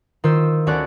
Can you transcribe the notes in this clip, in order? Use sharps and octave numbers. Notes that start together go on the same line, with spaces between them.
D#3 F4 C5 E6
D2 C#4 F#4 D5 F#6